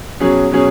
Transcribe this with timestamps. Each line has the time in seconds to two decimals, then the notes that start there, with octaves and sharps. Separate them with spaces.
0.20 B2 F#3 C#4 G#4
0.51 B2 F#3 C#4 G#4